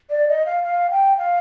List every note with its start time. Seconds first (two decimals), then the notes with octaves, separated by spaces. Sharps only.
0.10 D5
0.29 D#5
0.46 F5
0.63 F5
0.91 G5
1.17 F5